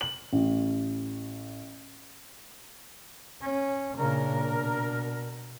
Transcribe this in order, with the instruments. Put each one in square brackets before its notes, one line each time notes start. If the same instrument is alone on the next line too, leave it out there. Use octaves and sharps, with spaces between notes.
[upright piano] F#7
A1
[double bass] C#4
[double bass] A#2 C#3 [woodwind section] D4 A#4
[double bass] B2